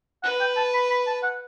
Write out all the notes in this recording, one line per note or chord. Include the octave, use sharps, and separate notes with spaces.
B4 F#5
G5
A5
B5
B5
A5
F#5